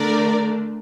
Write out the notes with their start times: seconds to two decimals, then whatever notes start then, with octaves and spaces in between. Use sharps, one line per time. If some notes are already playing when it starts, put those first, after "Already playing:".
Already playing: D3 A3 D4 A#4 D5